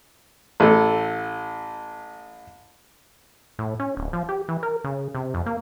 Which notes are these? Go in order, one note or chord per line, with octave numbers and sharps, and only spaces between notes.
A1 A4
A2
C#4
D1
F3
G4
E3
A#4
C#3
C3
F2
A#3